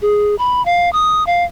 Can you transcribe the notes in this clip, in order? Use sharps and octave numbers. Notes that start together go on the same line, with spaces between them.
G#4
B5
F5
D#6
F5